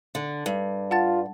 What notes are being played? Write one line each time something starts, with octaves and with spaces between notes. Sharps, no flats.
D3
G2
F4 F#5 A5 A6